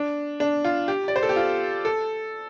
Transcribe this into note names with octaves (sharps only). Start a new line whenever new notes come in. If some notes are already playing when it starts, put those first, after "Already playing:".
Already playing: D4
D4
F4
G4
D5
C5
A4
G4
F4
A4